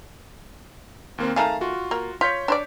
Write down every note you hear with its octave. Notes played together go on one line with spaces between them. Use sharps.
D#2 A#3 C4
D#3 A3 G#4 F5 A5 A#5
F4 F#4
A#3
F4 C#5 G6 B6
D4 C5 D5